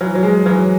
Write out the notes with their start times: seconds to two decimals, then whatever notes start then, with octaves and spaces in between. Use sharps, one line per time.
0.01 E3 F#3
0.15 F#3
0.23 G#3
0.46 E3 F#3